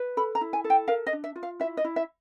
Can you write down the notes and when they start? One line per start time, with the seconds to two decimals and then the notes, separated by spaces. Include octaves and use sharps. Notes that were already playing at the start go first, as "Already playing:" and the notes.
Already playing: B4
0.17 A4 B5
0.35 A#5
0.41 E4
0.53 G#5
0.64 A4
0.70 G5
0.88 A#4 F5
1.07 D#5
1.13 D4
1.24 E5
1.36 F4
1.43 F5
1.60 E4 E5
1.77 D#5
1.84 E4
1.96 E5